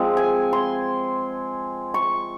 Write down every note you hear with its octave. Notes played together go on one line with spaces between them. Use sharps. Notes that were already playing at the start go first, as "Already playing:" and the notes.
Already playing: F3 G#3 C4
G#5
C6
C#6